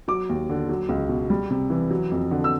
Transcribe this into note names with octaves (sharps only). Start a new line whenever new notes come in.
F#3 D6
D#2
D3
F#3
C#2
B2
G3
C3
E3
F#3
F2
D3
E6